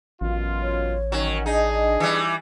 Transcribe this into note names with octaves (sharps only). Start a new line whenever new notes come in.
A1 F#2 B2 F4
C#5
D#3 F#3 C#4
D4 D#4 G#4 D#5
E3 G3